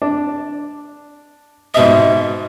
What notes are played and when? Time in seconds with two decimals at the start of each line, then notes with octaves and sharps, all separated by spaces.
0.02 D4
1.74 G#2 B2 D#5 E5